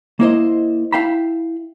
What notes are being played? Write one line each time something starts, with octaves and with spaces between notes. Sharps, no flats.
A#3 E4 C5 D#5
E4 F5 G5 A5 B5